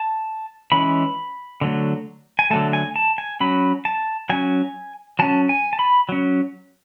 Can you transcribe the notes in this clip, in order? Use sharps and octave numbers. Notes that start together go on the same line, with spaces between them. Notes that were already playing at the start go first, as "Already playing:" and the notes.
Already playing: A5
E3 G#3 C#4 B5
D3 F#3 A3
G#5
D3 F#3 A3 A5
G#5
A5
G#5
F#3 C#4 B5
A5
F#3 C#4 G#5
F#3 C#4 A5
G#5
A5
B5
F#3 C#4